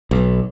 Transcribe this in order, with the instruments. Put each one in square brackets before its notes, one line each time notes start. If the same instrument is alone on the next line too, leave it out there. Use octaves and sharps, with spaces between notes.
[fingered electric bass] B1